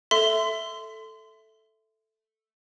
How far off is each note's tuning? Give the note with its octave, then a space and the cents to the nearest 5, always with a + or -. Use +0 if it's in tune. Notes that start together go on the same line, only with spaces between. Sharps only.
A4 +0 E5 +0 C6 -20